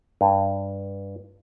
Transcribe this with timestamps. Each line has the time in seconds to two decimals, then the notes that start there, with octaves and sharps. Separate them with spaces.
0.21 G2